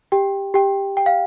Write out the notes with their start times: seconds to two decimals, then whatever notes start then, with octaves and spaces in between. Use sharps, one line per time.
0.12 G4 G5
0.54 G4 G5
0.97 G5
1.06 F5